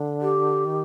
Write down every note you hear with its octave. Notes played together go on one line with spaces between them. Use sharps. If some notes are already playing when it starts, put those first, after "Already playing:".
Already playing: D3
G4
D#3